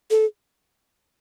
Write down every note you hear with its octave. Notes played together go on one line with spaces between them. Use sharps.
A4